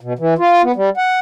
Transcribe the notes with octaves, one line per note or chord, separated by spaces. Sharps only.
B2
E3
F4
B3
G3
F#5